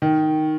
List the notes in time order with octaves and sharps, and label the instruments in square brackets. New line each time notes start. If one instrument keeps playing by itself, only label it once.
[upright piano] D#3